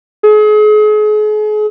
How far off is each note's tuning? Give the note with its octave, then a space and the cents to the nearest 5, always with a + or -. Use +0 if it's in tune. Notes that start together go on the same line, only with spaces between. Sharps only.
G#4 +40